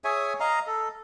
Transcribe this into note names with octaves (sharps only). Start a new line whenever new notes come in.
G#4 C#5 E5 G#5
D#5 F5 A#5
A4